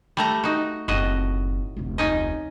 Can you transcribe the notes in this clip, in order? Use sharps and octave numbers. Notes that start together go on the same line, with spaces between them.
G3 A3 A#5
D#4 F#4
F#1 A2 C4 F#4 D#5
F1 D2
C#4 D#4 D#5